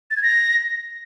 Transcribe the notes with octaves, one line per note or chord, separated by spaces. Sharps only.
A6
G#6
A#6